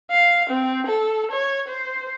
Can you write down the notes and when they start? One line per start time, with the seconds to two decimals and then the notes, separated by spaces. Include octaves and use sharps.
0.11 F5
0.50 C4
0.87 A4
1.31 C#5
1.68 C5